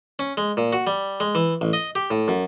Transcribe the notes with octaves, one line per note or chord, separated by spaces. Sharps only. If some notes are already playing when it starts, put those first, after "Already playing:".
C#4
G#3
A#2
F#4
G3
G#3
E3
A1
D#5
G4
A2
F#2